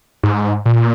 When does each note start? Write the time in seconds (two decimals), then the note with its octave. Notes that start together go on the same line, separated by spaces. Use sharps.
0.23 G#2
0.66 A#2